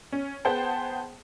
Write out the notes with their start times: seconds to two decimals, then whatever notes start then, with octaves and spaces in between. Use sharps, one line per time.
0.12 C#4
0.45 B3 G#4 C5 F#5 G5 A5